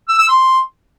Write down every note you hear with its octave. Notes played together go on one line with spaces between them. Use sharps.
E6
E6
C6